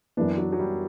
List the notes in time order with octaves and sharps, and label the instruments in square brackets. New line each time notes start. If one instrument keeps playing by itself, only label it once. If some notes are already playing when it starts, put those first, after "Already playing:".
[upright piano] F#2 E3 B3 [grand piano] D4
[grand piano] F#3
F#3
G3